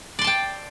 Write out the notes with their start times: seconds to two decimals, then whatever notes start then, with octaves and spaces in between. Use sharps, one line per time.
0.19 D5
0.21 C6
0.24 A5
0.27 G5